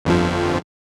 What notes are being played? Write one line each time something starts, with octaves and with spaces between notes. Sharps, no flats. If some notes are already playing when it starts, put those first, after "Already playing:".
G1 F2 F3